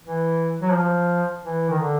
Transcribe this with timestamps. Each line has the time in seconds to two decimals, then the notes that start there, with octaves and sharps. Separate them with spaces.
0.03 E3
0.62 F#3
0.72 F3
1.43 E3
1.70 D#3
1.79 D3